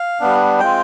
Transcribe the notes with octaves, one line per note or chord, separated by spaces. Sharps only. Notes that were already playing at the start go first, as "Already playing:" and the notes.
Already playing: F5
G3 B3 D4
G#3 C4 F4 G5